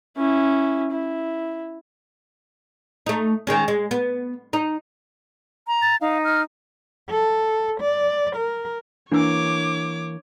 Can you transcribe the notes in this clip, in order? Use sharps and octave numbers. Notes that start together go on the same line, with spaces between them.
C#4 E4
E4
A3 D#4
D#3 G#3 C#4
G#3
B3
D#4
A#5
A6
D#4 F5
F6
A4
D5
A#4
E3 A#3 D4 C#5 G#5 D6 E6